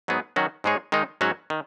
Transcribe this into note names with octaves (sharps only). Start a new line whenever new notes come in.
G#2 F#3 B3 G#4
D#3 F#3 C#4 F#4
G#2 G#3 D#4 G#4 C#5
D#3 G#3 D#4
G#2 F#3 C#4 F#4 C#5
D#3